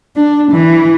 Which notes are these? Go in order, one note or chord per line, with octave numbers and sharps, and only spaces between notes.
D4
E3